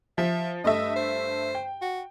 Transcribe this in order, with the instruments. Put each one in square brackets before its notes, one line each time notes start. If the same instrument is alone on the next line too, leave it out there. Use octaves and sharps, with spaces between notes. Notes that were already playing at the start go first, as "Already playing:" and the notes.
[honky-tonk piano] F3 [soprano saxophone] E5
[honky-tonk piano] G2 A3 E5 [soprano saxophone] D#5
[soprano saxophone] C5
[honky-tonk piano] G5
[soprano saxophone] F#4